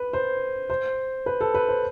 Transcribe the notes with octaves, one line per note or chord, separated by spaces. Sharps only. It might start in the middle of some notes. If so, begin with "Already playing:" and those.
Already playing: B4
C5
C5
B4
A4
B4
C5